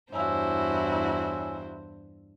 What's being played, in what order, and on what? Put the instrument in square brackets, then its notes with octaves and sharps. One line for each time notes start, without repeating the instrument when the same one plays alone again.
[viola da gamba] E2 G2 C5 [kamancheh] E4 F#4 [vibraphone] C#5 G#5 E6